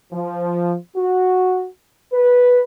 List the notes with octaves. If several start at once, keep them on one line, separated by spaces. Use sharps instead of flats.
F3
F#4
B4